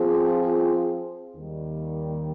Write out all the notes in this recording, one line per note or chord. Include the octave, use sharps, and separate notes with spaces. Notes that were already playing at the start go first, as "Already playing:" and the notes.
Already playing: F3 C4 F4 G#4
D#2 D#3 G3